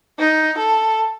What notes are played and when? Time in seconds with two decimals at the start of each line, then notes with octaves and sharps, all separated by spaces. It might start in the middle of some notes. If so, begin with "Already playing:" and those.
0.19 D#4
0.58 A4